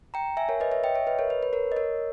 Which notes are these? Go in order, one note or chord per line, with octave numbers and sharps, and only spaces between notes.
G5 A#5
E5 G#5
A#4 C#5
B4 D#5
C#5 E5
D#5 G5
C#5 E5
B4 D#5
A#4 C#5
B4
B4
A#4 C#5
D#5
A#4 C#5